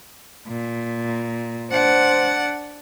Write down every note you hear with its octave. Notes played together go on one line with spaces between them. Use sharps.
A#2
D4 C5 F#5